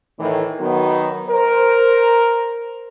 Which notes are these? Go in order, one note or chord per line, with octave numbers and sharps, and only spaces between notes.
A2 D#3 E3
D#3 F#3 B3
A#4 C5